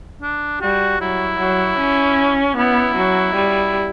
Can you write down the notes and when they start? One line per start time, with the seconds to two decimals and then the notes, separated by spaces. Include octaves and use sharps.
0.22 D4
0.61 G3 F#4
1.01 F#3 E4
1.39 F#3
1.79 C#4
2.56 B3 E4
2.96 F#3
3.35 G3